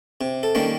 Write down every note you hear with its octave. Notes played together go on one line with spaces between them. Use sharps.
C3
A4
D#3 G3 A#3 C#4